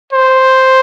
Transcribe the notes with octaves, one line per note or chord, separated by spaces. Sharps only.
C5